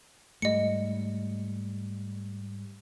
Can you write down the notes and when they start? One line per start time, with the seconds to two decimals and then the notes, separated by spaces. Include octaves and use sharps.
0.42 G#2 G3 A3 D#5 C#7